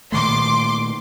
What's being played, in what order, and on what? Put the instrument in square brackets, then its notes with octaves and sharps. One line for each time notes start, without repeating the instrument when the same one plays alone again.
[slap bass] A#2 D#3 A3 [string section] C6 D6